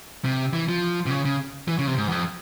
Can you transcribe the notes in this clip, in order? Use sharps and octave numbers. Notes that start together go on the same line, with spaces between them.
C3
E3
F3
C3
C#3
C#3
E3
C#3
C3
G#2
E2
F2